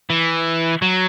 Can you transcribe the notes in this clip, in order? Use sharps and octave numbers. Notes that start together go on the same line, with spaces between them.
E3
F#3